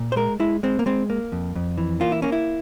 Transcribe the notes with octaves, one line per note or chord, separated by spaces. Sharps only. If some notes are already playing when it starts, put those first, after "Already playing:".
Already playing: A#2
C5
G#3 A#4
G#3 E4
G#3 C4
A#3
G#3 C4
A#3
F2
F2
E3
A#3 F4
E4
A#3 C#4
E4